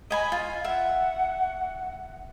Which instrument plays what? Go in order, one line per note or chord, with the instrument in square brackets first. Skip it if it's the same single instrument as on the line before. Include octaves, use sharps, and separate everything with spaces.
[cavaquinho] D#5 G#5 B5
F4
[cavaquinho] E5 [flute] F#5